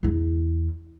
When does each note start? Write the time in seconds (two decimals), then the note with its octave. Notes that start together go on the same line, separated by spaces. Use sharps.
0.03 E2 E4